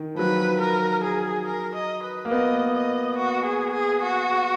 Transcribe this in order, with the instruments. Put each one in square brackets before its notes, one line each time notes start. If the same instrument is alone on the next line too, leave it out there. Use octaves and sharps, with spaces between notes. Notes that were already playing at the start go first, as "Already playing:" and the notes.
Already playing: [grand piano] D#3
F3
[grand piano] F#3 [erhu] B4
[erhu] A#4
G#4
A#4
D#5
B4
[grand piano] A#3
[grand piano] B3 [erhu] D#5
[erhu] D#5
F#4
G#4
G#4
F#4